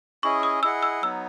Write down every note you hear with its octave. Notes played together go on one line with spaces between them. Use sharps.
C#4 E4 G#4 D#5 C#6
D#6
E4 G#4 D#5 F#5 E6
E6
F#3 B3 D#4 E6